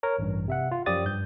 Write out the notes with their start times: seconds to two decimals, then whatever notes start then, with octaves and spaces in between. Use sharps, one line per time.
0.03 A#4 C#5 A#5
0.19 A1 G2
0.48 C3 E5 F#5
0.71 F4
0.86 F#2 F3 G4 D5 D#6 A6
1.06 G2 G6